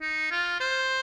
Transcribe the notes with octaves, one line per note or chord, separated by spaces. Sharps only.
D#4
F4
C5